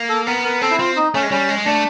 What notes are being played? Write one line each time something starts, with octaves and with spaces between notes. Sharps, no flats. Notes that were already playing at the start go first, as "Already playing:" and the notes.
Already playing: A#3
A4
B3 A#4
A#4
C4 A4
E4
C4 F4
D#4
A3 C#4
G#3
G3 C#4
G#3
A3 D4